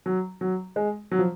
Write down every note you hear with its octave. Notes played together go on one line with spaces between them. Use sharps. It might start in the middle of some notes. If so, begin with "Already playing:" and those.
F#3
F#3
G#3
F#3
F3